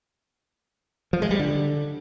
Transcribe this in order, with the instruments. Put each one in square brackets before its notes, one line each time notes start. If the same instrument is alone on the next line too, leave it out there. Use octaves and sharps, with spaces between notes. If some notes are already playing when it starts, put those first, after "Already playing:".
[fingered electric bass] F3
G#3
G3
D3